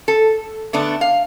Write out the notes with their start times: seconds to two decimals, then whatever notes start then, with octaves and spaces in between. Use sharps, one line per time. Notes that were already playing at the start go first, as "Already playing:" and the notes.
0.08 A4
0.73 D3 A3 B3 D4
1.01 F5